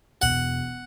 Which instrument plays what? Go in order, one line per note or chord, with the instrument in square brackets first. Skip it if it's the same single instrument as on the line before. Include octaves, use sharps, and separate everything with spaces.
[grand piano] E1 [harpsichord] F#5